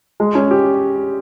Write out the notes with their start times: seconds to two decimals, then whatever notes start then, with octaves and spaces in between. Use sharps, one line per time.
0.20 G#3
0.35 C#4
0.51 G4